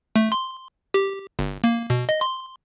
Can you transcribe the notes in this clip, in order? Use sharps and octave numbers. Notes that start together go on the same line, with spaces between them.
A3
C6
G4
G1
A#3
B2
D#5
C6